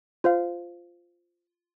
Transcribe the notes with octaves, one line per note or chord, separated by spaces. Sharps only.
F4 C5 F5